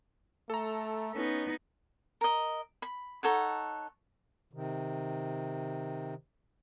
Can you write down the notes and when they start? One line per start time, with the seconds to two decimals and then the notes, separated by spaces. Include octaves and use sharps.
0.50 A3 A4 A#5
1.15 B3 C#4 D#4
2.21 A#4 D#5
2.82 B5
3.23 D#4 A4 C#5 F#5
4.53 C3 D#3